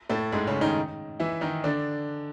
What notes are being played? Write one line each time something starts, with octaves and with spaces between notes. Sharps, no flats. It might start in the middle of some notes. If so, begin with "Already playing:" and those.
A2 A3
G#2 G#3
C#3 C#4
D#3 D#4
E3 E4
D#3 D#4
D3 D4